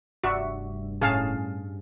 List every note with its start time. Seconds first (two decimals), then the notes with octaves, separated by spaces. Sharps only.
0.24 F1 G2 F#4 D5 E5
1.01 A2 C#4 G#4 F5 G#5 A5